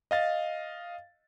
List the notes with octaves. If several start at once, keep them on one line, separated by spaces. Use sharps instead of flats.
D#5 F5 A6